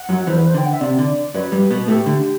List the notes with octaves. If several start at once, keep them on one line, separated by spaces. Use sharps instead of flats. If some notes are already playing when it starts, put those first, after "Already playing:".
Already playing: F#5
F#2 F#3
E2 E3 C5
B4
C5
D3 G5
F#5
E5
C3 D5
D3
F#2 F#3 B4
G2 G3
B2 B3
A2 A3 G4
D3